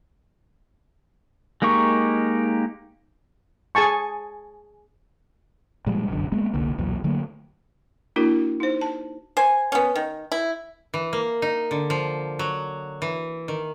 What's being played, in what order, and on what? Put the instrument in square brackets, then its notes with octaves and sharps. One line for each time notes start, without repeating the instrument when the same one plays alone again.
[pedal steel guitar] G#3 A#3 D#4 G4 C#6
[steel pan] G#4 G#5 A5 C#6
[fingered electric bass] A#2 F3 G3 G#3
F1 B1 F#2 D3
G#3 A#3 B3
E1 C2 D3 A#3
B1 E2 A#2 F#3
D3 F#3 A3 A#3
[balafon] A#3 D4 E4 F#4 A#4
D#4 C5
A5
[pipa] C5 G#5
B3 C#4
D#3
E4
[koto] E3
A#3
D#4
D3
F3
F#3
E3
D#3